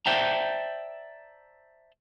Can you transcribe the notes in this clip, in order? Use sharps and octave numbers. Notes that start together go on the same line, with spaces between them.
C5 D5 E5 G5 A5 A#5